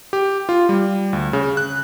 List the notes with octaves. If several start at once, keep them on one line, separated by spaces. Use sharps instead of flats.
G4
F4
G3
D2
C#3
F#6